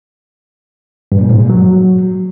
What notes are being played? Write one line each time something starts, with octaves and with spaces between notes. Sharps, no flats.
G2
A#2
G#2
A#2
F#3